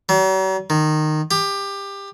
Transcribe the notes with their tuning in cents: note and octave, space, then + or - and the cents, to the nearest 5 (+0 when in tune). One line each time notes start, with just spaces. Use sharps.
F#3 +45
D#3 -15
G4 +20